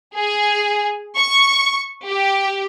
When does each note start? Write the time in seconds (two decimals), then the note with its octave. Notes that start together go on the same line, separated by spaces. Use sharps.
0.14 G#4
1.16 C#6
2.08 G4